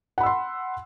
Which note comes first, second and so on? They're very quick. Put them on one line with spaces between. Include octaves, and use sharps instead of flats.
F#5 B5 E6 C6